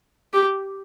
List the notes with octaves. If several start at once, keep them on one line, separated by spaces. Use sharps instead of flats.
G4